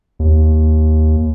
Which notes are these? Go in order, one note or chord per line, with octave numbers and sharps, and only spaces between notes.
D#2